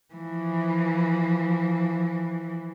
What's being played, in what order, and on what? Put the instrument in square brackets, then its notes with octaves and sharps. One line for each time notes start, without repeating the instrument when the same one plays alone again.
[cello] E3 F3